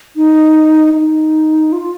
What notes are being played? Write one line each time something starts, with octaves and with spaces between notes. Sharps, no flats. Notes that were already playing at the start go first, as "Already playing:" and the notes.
D#4
D#4
F4